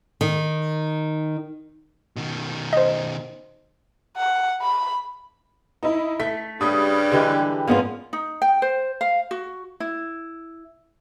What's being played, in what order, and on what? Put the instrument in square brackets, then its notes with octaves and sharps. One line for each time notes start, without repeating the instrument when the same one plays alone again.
[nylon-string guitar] D#3
[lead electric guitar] B2 D#3
[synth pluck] C5 D#5
[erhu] F#5
B5
[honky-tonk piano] D#4 E4
[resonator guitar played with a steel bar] A3 [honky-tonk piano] B6
[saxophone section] G2 C#3 G3 [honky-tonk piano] B5 D#6
[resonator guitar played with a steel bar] D3 E3 G#3 [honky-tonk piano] G4 B5
[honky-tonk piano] G#1 B3 G#4 [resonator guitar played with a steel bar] A#3 C#4 F4
[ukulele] D#4
G5
C5
F5
F#4
E4